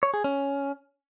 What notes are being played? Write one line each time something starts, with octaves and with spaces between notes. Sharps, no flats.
C#5
G#4
C#4